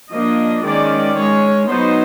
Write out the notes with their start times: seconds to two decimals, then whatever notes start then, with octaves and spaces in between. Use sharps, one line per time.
0.13 F3 A#3 D4 D#5
0.65 D#3 G#3 C#4 D5
1.17 G#3 C#4 C#5
1.69 F#3 B3 D#4 C5